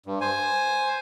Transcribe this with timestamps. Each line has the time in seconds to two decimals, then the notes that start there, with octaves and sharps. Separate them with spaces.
0.06 G2
0.21 C5 G#5